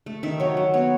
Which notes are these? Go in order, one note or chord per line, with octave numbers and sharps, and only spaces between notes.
A3
D#3 E5
F#3 C#5
F#3
B3 C#5